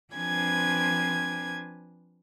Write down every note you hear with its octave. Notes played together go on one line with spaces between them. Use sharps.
F3 C4 D4 B4 G#5 G#6